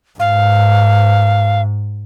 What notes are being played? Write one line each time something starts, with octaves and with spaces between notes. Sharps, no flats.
G#2 F5